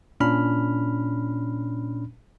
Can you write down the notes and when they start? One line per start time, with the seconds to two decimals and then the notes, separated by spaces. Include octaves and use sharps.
0.20 A#2 C#4 D4 B5 F6